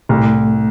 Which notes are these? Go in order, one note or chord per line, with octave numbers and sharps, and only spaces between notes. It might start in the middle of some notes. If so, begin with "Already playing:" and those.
C2 A2 A3